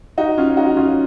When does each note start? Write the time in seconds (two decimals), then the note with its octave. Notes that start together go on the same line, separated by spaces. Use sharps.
0.18 D#4 F#4
0.38 C#4 F4
0.57 D#4 F#4
0.77 C#4 F4